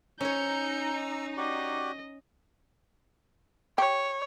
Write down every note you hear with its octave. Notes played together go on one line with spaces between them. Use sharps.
C#4 D#4 C#5 A#5 E6 G6 C#7
F#4 G4 D5 D#5
G4 C#5